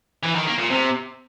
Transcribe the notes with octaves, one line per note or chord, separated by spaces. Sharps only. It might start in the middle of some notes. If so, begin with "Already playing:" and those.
E3
D#3
A#3
A#2
C3